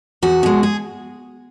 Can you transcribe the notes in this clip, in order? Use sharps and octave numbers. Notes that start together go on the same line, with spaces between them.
E2 F#4
B2 G#3
G#4